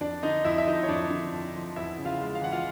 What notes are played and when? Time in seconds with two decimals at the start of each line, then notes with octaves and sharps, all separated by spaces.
0.01 F2 D4 D5
0.23 D3 D#4 D#5
0.45 F2 E4 E5
0.58 E5
0.67 F3 D#4 D#5
0.83 C#5
0.88 F2 D4 D5
1.10 D3
1.32 F2
1.54 F3
1.76 E2 E4 E5
1.98 C#3
2.05 F4 F5
2.20 G#3
2.35 F5
2.42 E3 F#5
2.52 F4 F5